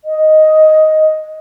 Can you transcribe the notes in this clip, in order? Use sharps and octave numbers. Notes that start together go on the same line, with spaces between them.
D#5